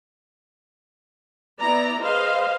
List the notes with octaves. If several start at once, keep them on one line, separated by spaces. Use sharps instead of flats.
B3 E4 D5 A#5
G#4 B4 C5 D#5 F5